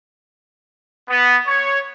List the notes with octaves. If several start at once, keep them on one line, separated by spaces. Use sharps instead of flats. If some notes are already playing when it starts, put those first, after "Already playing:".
B3
C#5